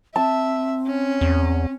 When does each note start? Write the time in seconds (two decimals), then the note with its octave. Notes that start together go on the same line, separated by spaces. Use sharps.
0.16 C4 E5 A5
0.87 C#4
1.21 E2